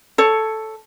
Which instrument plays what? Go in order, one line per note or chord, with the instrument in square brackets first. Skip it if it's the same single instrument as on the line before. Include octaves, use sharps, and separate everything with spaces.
[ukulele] A4 C#5